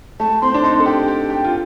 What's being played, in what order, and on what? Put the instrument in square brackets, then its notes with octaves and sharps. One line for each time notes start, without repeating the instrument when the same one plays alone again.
[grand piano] A3 [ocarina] A5
[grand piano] C4 [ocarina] C6
[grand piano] D4
[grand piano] D#4 [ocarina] C6
[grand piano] A4
[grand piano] G4 [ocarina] G5
[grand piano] G4
G4
F4